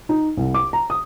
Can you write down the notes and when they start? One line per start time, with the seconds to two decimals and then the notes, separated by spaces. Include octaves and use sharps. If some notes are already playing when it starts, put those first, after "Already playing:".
0.09 D#4
0.37 C2
0.54 D6
0.73 A#5
0.90 D#6